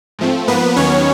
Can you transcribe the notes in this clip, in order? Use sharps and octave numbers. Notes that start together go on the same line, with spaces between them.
G#2 F3 A3 C4
G#2 F3 A#3 B3 B4
D#2 D#3 F#3 B3 C#4 C#5